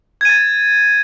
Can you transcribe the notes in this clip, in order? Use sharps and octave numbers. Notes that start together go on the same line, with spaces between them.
G#6 A6 D#7